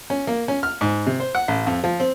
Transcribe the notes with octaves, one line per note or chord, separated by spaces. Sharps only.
C#4
A#3
C#4
F6
G#2
C3
C5
F#5
A1
F2
F3
C4